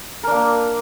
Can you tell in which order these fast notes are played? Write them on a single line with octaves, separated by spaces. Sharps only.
A#4 D4 A#3